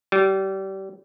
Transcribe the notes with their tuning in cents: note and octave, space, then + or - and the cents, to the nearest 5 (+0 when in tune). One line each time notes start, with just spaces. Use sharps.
G3 -30